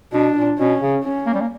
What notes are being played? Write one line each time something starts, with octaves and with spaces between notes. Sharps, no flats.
B2 D4
A#2
B2 C#4
C#3
C#4
A#3
G3
A#3